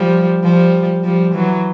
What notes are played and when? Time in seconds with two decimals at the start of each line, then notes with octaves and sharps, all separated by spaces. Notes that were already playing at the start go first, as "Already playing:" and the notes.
Already playing: F3 G3
0.44 F3 G3
1.04 F3 G3
1.34 E3 F#3